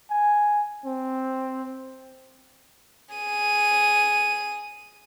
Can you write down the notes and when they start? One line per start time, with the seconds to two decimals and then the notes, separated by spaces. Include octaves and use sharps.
0.11 G#5
0.85 C4
3.15 G#4 D#7